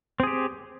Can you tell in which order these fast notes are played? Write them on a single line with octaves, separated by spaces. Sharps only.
C4 G#4 G4